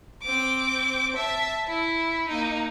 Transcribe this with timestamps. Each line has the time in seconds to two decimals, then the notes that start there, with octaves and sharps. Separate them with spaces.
0.23 C4 D6
1.16 E5 A5
1.68 E4
2.29 A#3 D#4